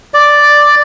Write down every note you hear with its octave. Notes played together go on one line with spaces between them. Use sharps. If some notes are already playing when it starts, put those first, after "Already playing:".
D5